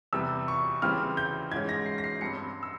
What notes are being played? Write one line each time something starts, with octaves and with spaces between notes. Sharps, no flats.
E2 C3 G3 E6
C#6
C#3 E3 G3 C4 F6
G6
G#2 E3 G#3 C#4 G#6
A#6
C7
A#6
C7
G2 G3 C4 C#7
E6